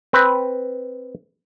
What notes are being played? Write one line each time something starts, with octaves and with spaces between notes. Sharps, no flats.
C4 B4